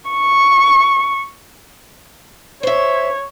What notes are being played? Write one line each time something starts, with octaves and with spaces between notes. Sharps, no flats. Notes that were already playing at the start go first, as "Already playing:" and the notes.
C#6
C5 C#5 E5